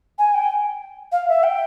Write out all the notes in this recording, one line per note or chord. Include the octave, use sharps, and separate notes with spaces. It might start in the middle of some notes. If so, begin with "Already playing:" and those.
G#5
G5
F5
E5
G5